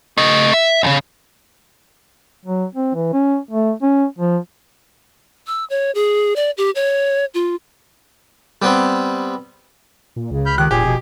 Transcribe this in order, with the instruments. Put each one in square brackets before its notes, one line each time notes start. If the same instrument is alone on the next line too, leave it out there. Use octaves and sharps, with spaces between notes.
[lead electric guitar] A3 D#5
E5
C2 C#3
[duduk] F#3
C4
E3
C#4
A3
C#4
F3
[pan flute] E6
C#5
G#4
D5
G4
C#5
F4
[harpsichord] G3 B3 C4
[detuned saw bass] A#2
[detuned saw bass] C#2 [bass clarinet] C#3
[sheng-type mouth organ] B5 F6 G6
[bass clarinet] D#3 [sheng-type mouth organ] G4 [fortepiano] F#6
[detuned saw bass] F1 [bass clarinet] A#2 [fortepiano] G4 [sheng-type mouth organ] G#4
[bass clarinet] B2